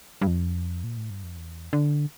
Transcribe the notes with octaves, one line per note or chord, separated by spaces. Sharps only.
G2
F2
A#2
A2
G2
F2
E2
D3